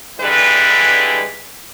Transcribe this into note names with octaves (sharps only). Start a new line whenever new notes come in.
D3 E3 G3 G#3 B4